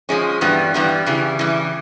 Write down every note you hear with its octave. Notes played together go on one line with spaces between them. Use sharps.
F3 G#3 C#4
G2 E3 G3 B3
G2 E3 G3 B3
C#3 E3 G3
C#3 E3 G3